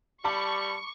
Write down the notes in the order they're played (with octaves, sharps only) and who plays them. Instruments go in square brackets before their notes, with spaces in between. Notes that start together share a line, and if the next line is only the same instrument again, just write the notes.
[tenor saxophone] G3 [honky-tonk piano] A5 B5 D6 [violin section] C#6